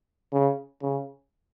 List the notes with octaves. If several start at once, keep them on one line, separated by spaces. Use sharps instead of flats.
C#3
C#3